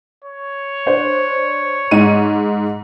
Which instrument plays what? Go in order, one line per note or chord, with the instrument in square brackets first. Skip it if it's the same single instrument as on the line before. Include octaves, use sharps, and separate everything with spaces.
[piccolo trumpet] C#5
[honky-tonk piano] D4 C5
G#2 G#3 D#7